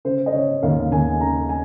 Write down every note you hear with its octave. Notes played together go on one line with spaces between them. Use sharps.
C#3 C5
D#5
C#3 C#5
D#2 F5
D#2 G#5
C#3 A#5
G#5